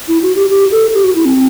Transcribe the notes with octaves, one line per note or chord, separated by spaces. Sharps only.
E4
F#4
G4
G4
A4
G4
F#4
E4
C4